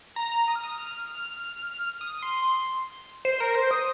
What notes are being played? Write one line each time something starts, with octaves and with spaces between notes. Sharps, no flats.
A#5
D#6
F6
D#6
F6
D#6
C6
C6
C5
A#4
C5
D#6